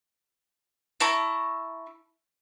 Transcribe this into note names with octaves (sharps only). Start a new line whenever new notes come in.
E4 A5 A#5 C#6